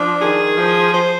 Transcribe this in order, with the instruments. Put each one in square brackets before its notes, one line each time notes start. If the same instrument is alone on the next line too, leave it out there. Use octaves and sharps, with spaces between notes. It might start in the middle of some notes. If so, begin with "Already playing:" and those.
Already playing: [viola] F3 [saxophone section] D4
[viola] D#3 [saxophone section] G#4
[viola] F3 [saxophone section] C5
[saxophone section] C5